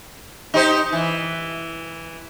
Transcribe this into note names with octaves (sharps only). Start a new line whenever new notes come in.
D#4 G4 C5
E3